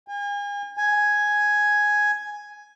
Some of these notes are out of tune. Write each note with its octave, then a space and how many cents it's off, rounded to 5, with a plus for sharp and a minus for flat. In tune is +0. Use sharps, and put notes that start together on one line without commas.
G#5 -40
G#5 +5